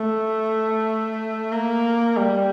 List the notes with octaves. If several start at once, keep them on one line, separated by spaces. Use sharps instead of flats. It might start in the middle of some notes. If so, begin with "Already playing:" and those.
Already playing: A3
A#3
G3